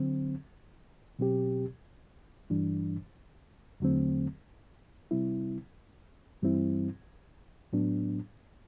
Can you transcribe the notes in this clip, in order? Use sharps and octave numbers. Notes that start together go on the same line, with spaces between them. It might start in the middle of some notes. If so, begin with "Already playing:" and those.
Already playing: D3 F#3 C4
B2 F#3 C4 G4
G2 E3 G3 D4
E2 D3 F#3 A3 C4
C3 G3 C4 E4
G2 E3 G3 C4 E4
A2 F#3 B3 D4